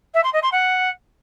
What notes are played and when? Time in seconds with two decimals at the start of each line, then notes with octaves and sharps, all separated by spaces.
0.14 E5
0.24 C6
0.33 D#5
0.43 C6
0.52 F#5